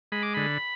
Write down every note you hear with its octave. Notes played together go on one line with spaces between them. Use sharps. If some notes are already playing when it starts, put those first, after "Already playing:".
G#3 B5
D6
D3 B5